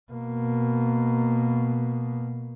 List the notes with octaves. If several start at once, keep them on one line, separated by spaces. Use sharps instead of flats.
B2 A#3